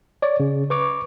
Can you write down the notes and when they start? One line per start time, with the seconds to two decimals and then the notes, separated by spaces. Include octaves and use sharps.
0.22 C#5 D5
0.40 C#3
0.70 B4 C#6 D6